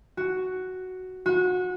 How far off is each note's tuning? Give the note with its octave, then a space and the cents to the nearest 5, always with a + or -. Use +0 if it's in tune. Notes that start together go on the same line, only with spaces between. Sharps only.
F#4 +5
F#4 -25